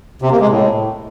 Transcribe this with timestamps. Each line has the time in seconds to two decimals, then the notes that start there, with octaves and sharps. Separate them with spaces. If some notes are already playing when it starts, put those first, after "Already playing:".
0.22 C3
0.31 A#3
0.40 G#3
0.49 A2